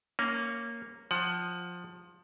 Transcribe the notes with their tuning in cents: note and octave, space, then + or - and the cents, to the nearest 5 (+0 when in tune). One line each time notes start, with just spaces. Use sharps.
A#3 -5 C#4 +0
F3 +15 F#5 +25